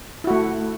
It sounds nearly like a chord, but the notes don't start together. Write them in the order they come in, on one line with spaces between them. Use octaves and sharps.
E4 F#4 A3